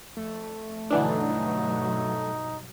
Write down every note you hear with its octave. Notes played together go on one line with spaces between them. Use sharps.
F2 A3
G2 B2 D3 E3 F#3 D4 D#4